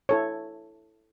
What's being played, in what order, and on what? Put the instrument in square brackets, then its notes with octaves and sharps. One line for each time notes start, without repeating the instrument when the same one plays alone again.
[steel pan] E4 A4 C#5